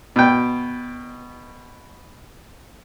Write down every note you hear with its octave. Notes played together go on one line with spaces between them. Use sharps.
B2 G5